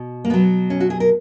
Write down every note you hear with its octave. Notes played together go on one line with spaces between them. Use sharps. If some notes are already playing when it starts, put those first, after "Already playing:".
Already playing: B2
A#3
B2 F#3 B3
C#4
F#4
G#4
A#4